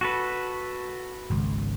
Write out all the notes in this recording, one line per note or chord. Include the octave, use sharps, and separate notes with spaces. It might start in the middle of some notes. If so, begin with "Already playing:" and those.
F#4 A4 B4
G#1 C#2